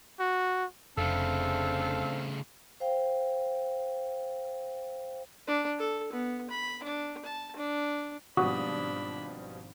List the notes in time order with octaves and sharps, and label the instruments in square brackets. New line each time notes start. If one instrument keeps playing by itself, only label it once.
[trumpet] F#4
[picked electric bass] F1 [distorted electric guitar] C#3 A3 [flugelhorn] C4 [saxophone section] D4 A4 F5
[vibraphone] C5 F5 G5
[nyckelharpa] D4
A4
B3
B5
D4
A5
D4
[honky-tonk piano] G#1 D#6 [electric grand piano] B2 F3 G3 [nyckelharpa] D4 B5 [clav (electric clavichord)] F#4